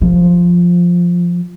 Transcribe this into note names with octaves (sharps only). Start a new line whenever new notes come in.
F3